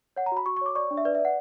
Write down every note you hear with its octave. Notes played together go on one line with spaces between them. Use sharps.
C#5 F#5
A#5
F#4 B5
F#4 C#6
C#6
C#5 D6
D5 C#6
D4
E5
B4 D5
E5
D5
F#5